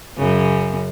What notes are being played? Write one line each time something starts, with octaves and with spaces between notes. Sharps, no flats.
F#2 C#3